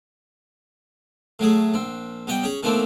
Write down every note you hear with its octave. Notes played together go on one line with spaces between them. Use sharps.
A2 F#3 A3 G#4
A#1 C4
B2 G3 D#5 G5
C#4 G#4
B2 D#3 E3 A3 A#3 C4